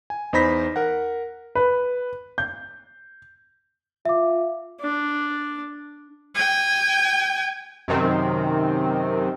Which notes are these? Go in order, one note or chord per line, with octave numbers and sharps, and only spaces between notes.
G#5
E2 D#4 C5 B5 A#6 B6
A#4 F#5
B4
G6
F4 E5 D6
D4
G5 G#5
F#2 C3 D#3 C4